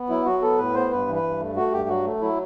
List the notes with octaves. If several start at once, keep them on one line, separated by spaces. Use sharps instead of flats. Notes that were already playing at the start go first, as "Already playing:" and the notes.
Already playing: B3
F#3 E4
F#3 F#4
B3 A4
A2 B4
B3 C5
G2 B4
E3
B4
G2
A3
A3 F#4
G2 G4
F#3 F#4
A3
F#3 E4